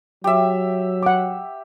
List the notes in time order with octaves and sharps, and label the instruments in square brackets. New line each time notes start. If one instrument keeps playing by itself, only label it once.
[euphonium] F#3 [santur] G4 E5
[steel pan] F#5 D6